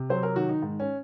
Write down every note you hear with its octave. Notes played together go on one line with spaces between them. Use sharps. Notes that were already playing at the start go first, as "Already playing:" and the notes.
Already playing: C3
F#3 C5
A#4
D#3 F#4
D#4
G#2
C#4